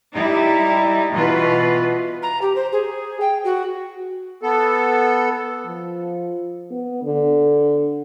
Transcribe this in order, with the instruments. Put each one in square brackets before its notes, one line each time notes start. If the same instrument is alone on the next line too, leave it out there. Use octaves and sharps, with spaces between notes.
[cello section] G3 D#4 E4
B2 E3 F4 B4
[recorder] A#5
G4
C5
G#4
G5
F#4
[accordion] B3 A4
[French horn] F3
B3
D3